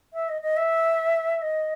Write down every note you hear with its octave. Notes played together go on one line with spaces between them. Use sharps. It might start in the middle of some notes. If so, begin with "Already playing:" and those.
E5
D#5
D#5
E5
D#5